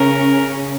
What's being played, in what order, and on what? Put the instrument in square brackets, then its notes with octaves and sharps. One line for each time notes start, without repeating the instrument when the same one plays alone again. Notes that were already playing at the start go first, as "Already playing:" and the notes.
Already playing: [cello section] C#3 C#4 [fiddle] A#4